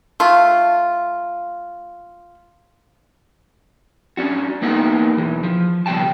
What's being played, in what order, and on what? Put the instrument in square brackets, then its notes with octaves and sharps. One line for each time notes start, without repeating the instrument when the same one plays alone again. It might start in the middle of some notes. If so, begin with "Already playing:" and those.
[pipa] A3 F4
[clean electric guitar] C#4 D4 F#4
A#3 B3 D#4 A#4 C#5 F#5
B1 E2 E3
F3
C#2 B2 G3 G5 A5